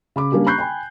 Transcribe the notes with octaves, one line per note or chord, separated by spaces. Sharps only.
C#3 B5 D6
G3 A#3 C#4 D4 G4
A#5 B5 C#6 F#6 G6 C7
G5 G#5 B5